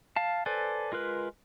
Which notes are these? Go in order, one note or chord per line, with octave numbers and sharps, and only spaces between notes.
F5 A5
A4 B4 C5 D5 G#5
G#3 F4 A#4 B4